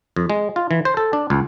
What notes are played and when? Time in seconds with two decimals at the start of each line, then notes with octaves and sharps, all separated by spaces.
0.16 F2
0.30 G#3
0.56 F4
0.71 E3
0.85 C5
0.97 A4
1.13 D4
1.30 C#2